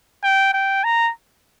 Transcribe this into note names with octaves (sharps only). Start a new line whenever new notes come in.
G5
G5
A#5